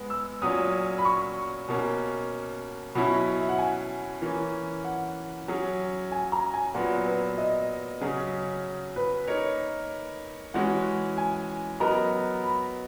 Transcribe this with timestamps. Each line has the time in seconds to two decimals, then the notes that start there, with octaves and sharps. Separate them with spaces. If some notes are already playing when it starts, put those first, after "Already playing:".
Already playing: G#3 B3
0.10 E6
0.42 A#2 F#3 C#4 D#6
0.98 B5
1.05 C#6
1.69 B2 A#3 C#4
2.95 B2 F#3 C#4 E4 B5
3.40 E5
3.49 F#5
3.58 G#5
4.22 E3 A#3 C#4
4.85 F#5
5.48 F#3 C#4 G#4
6.12 G#5
6.32 A#5
6.54 G#5
6.74 A#2 F#3 B3 F#5
7.06 B4
7.38 D#5
8.01 C#3 F#3 C#4 G#4
8.96 B4
9.27 A#3 D#4 A#4 C#5
10.54 E3 G#3 C#4 F#4 F#5
11.18 G#5
11.80 F#3 B3 F#4 A#4 D#5 A#5
12.44 B5